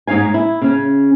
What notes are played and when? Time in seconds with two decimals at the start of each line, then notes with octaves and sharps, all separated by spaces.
0.07 G#2 D#4 C#5 F5 G#5
0.34 E4
0.62 C#3 C#4